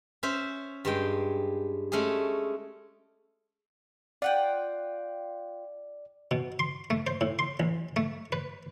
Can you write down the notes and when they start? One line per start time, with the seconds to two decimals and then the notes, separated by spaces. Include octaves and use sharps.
0.23 C#4 C5 E5
0.85 G2 G#3 G5
1.92 G#3 A3 C#4 D4 G#4
4.22 F4 D5 F#5 G5
6.31 B2
6.59 C6
6.90 A3
7.07 C5
7.21 A2
7.39 C6
7.60 A1
7.96 A3
8.32 B4